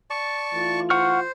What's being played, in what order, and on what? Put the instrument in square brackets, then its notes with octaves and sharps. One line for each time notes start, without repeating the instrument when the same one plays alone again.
[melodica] D5 A5 C#6
[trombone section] E3 A3 F4
[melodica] C5 [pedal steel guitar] F#5 C#6 F6